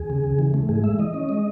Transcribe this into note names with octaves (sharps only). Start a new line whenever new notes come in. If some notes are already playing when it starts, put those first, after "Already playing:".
Already playing: D#2 G#4
C#3
C#3
E3
A3
G#2 G#4
G#3 E5
E3 D#5
C#4
G#3